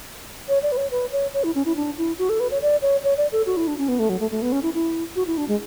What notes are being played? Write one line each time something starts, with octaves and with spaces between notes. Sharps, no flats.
C#5
D5
B4
C#5
B4
C#5
C#5
E4
C#4
E4
D4
E4
F#4
A4
B4
C#5
D5
C#5
C#5
D5
A4
F#4
E4
D4
C#4
B3
A3
F#3
A3
A3
B3
C#4
E4
E4
F#4
E4
D4
G#3